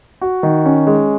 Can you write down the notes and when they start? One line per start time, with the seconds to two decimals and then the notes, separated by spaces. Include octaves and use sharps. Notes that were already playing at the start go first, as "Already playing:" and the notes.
0.21 F#4
0.43 D#3
0.65 C#4
0.87 G#3